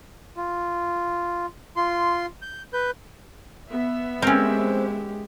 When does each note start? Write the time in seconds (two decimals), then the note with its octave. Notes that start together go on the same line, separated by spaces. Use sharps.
0.37 F4
1.76 F4 C6
2.42 G6
2.73 B4 G6
3.71 B3 E5
4.22 G#3 C4 C#4 G4 A#4